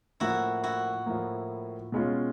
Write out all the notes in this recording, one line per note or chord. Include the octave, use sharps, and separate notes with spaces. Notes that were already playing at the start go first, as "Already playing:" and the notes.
A2 F3 A#3 E4 F#4
E4 F#4
A2 F3 A#3
B2 G#3 C#4 F4